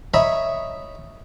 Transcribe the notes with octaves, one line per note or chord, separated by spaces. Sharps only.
C#5 D#5 E5 A#5 B5 C#6